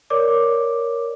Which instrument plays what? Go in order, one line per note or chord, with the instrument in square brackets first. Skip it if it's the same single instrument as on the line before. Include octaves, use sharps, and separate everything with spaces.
[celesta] A#4 C#5 D5 D6